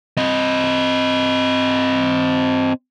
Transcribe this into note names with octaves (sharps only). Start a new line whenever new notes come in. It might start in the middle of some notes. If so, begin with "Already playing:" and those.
C4 D#5